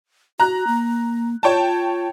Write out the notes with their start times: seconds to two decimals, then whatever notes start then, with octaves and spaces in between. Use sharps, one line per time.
0.40 F#4 A#5 F#6
0.67 A#3
1.43 F4 C#5 G5 A5